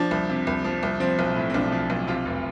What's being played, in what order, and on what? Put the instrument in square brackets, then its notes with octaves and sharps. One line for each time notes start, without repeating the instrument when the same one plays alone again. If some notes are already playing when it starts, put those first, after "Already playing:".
Already playing: [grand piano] F3 D4
C2
C3
C2
F3
C2
F3 C4
B1
A2
C4
B1 D4
F3
B1
C3 F4
F1